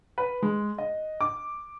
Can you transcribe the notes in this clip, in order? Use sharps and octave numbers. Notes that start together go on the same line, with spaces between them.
B4
G#3
D#5
D6